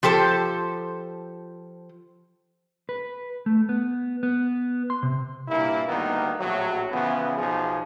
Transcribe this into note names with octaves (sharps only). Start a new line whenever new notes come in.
F3 G4 A4 C5
B4
A3
B3
B3
C6
C3
G2 A#2 A#3 E4
D2 D#3 G3 A#3 B3
A#1 A2 F#3
C#3 E3 F3 B3
B1 F3 D#4 G#4